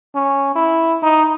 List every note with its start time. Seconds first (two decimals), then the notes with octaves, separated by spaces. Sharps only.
0.15 C#4
0.56 E4
1.03 D#4